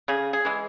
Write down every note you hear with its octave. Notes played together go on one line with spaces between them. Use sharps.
C#3 G#4
G#4
E3 G#3